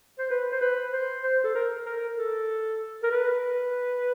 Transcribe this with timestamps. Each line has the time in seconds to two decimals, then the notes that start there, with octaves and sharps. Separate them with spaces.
0.19 C5
0.30 B4
0.52 C5
0.61 B4
0.92 C5
1.23 C5
1.44 A4
1.55 A#4
1.86 A#4
2.17 A4
3.03 A#4
3.11 B4